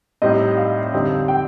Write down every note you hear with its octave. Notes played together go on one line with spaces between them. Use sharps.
A2 G3 C4 D#4 D#5
F5
F2 D3 G3 C4 D#4
G5